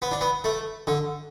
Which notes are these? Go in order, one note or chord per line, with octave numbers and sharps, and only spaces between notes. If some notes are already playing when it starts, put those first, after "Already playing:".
B3
D4
B3
A3
D3